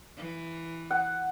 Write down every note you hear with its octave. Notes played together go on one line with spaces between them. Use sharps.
E3
F#5